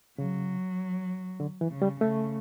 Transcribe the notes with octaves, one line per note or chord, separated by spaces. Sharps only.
C#3 F#3
D3
E3
C#3
G3
C#3 A3